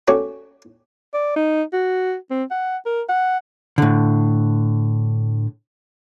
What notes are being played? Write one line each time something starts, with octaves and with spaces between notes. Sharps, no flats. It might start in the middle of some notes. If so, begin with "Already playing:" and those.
A3 C#4 F#4 C#5 D5 G5
D5
D#4
F#4
C4
F#5
A#4
F#5
A2 D3